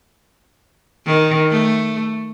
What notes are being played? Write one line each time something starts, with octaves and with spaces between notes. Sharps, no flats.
D#3
A3